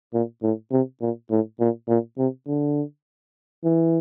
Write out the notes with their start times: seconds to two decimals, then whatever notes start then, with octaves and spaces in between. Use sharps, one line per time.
0.14 A#2
0.43 A2
0.72 C3
1.01 A#2
1.30 A2
1.60 A#2
1.89 A#2
2.18 C3
2.47 D3
3.64 E3